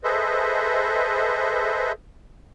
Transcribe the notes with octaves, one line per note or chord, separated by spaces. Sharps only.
G#4 A4 B4 C5 D#5 E5